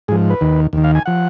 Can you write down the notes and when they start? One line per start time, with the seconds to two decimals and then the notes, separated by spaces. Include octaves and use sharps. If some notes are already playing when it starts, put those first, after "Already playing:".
0.08 G#2 F3 G#4
0.30 B4
0.41 D#2 D#3
0.73 D#2 D#3
0.84 F5
0.95 G#5
1.06 F3 F#5